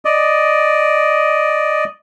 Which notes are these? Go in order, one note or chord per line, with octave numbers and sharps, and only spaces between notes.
D5 D#5